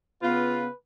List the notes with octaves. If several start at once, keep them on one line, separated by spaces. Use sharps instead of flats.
C#3 B3 F4 B4